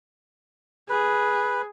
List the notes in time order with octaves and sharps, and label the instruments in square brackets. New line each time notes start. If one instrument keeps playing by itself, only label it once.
[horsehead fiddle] G#4 [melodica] B4